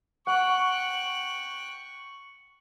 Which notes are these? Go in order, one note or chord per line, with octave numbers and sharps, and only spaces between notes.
F#5 G5 C#6 F#6